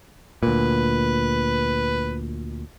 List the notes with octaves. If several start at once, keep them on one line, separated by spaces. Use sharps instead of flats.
D2 A#2 B4